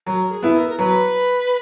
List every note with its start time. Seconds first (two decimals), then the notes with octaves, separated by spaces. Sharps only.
0.07 F#3 A#4
0.31 G#4
0.43 B3 E4
0.54 A#4
0.69 A#4
0.78 F#3 B4